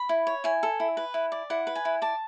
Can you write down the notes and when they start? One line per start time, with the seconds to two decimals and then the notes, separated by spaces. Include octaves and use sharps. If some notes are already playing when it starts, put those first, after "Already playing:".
Already playing: B5
0.09 E4
0.27 C#5
0.44 E4 G#5
0.63 A4
0.80 E4
0.97 B4
1.14 E4
1.32 D5
1.50 E4 F#5
1.67 B4
1.75 G#5
1.85 E4
2.02 D5 A5